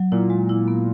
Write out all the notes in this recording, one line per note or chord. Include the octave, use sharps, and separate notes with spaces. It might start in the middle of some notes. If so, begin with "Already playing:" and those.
Already playing: F#3
A#2 E4
G#3
E4
B3